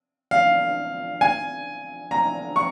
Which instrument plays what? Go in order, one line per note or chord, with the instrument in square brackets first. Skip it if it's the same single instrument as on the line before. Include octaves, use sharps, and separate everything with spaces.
[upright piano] F5
G#5
A#5
C#6